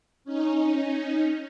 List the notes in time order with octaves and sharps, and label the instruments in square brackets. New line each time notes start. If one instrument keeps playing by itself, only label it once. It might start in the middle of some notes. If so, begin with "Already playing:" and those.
[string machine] C#4 D#4